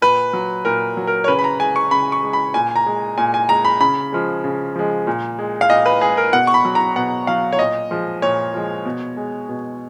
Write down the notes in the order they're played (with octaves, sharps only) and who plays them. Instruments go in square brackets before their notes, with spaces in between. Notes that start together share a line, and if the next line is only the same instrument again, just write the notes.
[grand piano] A#2 B4
F#3
A#2 A#4
F#3
A#4
C#5
C#3 B4
B5
A#5
G#3 G#5
C#6
C#3 B5
C#6
G#3
B5
A#2 G#5
A#5
G#3
A#2 G#5
G#5
G#3 A#5
B5
C#3 B5
F3 G#3
C#3
F3 G#3
A#2
G#3
F5
A#2 D#5
B4
G#3 G#4
A#4
B2 F#5
C#6
B5
F#3
A#5
B2 F#5
F#3 F5
C#5
A#2 D#5
F3 G#3
A#2 C#5
F3 G#3
B2
G#3
B2